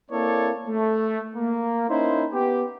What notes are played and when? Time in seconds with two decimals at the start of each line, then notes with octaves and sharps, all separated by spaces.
0.11 A#3 C4 E4 A4 C#5 D5
0.68 A3
1.36 A#3
1.89 A#3 C#4 D#4 E4 C5
2.33 B3 G4